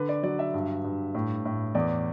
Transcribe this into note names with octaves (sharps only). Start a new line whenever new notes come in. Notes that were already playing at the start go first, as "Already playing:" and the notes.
Already playing: D3 B4
D5
F#3 D5
E5
G2
G2
A2
A2
E2 D5